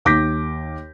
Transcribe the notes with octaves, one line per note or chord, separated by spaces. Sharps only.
D#2 D6 G6 A#6 B6